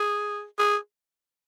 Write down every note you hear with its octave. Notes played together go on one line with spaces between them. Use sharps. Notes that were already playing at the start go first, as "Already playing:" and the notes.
Already playing: G#4
G#4